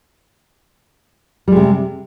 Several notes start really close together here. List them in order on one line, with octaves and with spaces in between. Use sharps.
G3 G#3 C3